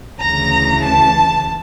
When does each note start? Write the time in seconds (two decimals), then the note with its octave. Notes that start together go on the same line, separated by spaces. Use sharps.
0.21 D2 C#3 E3 A#5
0.82 A5